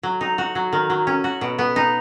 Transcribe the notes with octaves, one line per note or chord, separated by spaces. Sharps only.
F#3
D#4
F#4
F#3
D#3
F#3
C#4
F#4
B2
B3
D#4